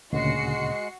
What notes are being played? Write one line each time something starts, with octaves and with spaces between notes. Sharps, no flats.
D2 A#2 C#3 G#3 F#4 C7 C#7